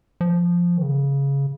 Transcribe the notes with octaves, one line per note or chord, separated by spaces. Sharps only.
F3
D#3
C#3